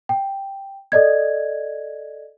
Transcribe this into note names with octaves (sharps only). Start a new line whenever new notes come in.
G5
A4 D5 D#5 G#6